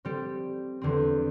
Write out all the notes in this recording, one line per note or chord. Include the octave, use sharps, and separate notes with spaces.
G3 C4 G4
E2 D3 C4